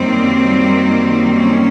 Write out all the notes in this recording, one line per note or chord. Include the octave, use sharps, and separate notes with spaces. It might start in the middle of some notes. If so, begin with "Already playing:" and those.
Already playing: F#2 D#3 G3 A#3 C4
C#4